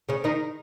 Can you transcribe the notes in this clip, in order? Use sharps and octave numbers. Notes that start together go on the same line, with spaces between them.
C#3 C#4
D#3 D#4